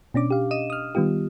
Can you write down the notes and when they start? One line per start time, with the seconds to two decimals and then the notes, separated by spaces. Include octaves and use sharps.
0.14 B2 C#4 D4 D6
0.30 G4 F5
0.51 D#5 D#7 E7
0.70 D#6 F6
0.95 D#3 G3 B3 F4 G4